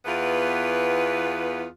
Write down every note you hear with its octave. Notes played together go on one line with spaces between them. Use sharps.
E2 E3 B3 F4 B4